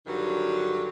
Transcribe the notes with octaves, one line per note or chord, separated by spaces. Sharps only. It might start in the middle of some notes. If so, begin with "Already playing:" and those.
G2 D3 D#3 F#3